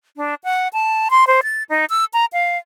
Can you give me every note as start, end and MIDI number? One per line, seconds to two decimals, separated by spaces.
0.17 0.35 62
0.44 0.68 78
0.73 1.08 81
1.11 1.25 84
1.27 1.41 72
1.43 1.63 93
1.69 1.85 63
1.90 2.05 88
2.13 2.25 82
2.33 2.58 77